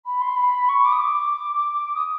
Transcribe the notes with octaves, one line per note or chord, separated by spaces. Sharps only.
B5
C6
B5
C#6
D6
D#6
D6
D#6